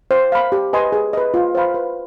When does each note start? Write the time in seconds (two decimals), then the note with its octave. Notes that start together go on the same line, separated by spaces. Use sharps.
0.11 C5
0.32 F5 B5
0.52 G4
0.73 B4 D#5 G#5 C6
0.92 G#4
1.13 B4 D#5
1.34 F4
1.55 C5 F5 B5
1.74 B4